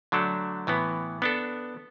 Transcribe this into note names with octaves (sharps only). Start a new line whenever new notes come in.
D3 F#3 A3 D4 A4
A2 E3 B3
B3 D4 A4